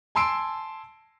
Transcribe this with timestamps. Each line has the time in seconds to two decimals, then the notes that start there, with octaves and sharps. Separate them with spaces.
0.15 G#5 A5 C6 E6 C7 D7